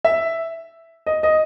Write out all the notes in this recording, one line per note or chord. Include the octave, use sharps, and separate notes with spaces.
E5
D#5
D#5